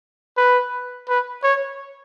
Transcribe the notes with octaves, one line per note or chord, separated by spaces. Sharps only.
B4
B4
C#5